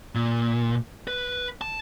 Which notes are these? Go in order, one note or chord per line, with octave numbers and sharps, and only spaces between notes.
A#2
B4
A5